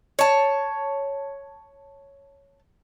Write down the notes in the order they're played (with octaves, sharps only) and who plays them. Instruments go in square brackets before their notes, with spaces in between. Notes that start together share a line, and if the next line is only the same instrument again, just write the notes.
[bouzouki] C#5 A5